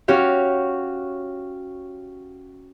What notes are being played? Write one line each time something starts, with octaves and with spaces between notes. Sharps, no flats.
C#4 F#4 G4 F5